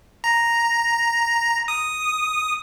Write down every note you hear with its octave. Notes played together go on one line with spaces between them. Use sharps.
A#5
D#6